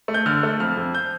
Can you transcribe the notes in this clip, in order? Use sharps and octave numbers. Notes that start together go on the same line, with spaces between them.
A3
G6
D3 F6
A3
F2 F6
F2
G6